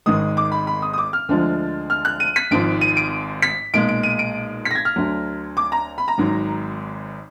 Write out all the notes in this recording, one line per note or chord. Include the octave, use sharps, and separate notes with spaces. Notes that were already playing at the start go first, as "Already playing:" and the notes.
G#1 G#2 D#3 G#3 D#6
D6
B5
B5
D#6
D#6
D6
F6
D2 D3 F3 G#3
F6
F#6
D#7
B6
G#1 G#2 F3 D7
D#7
D7
B6
B1 A#2 G#3 D7
D7
D#7
D7
B6
A#6
G#6
F6
D2 D3 F#3
D6
A#5
B5
A#5
G#1 G#2 F#3